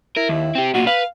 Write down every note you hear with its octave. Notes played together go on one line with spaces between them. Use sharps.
E4 A#4
D#2
C4 G4
B1 A#2 F#4
B4 F5